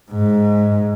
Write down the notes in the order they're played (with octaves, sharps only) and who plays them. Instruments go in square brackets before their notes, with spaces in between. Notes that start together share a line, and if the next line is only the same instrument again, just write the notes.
[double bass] G#2